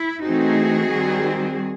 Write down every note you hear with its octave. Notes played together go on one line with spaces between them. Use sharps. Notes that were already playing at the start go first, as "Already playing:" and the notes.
Already playing: E4
E3 A3 C4 D#4 F#4 G#4
D#3 G3 C4